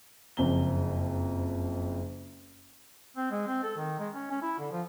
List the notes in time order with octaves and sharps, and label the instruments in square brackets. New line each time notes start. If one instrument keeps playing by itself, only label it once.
[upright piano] F#1 F2 C#3 C4 A#5 G7
[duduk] C4
G#3
C4
A4
D#3
G#3
C#4
C#4
E4
D3
F3